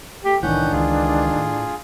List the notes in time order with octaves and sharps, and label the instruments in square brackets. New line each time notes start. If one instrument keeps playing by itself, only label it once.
[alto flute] A3 [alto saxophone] G4
[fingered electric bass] C2 A2 E3 [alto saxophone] D#3 [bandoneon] C#4 F#5 G6 [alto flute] D4
[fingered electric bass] C#2 E3 [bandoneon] F4 G#4
[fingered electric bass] A2